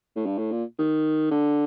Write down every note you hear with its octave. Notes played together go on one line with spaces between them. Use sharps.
A2
G2
A2
A#2
D#3
D3